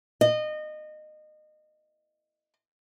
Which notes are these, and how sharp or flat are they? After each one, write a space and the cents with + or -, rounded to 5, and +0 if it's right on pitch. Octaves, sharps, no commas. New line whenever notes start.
D#5 -25